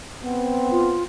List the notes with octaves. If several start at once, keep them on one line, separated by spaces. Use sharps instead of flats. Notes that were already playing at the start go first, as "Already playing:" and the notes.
B3 C4
F4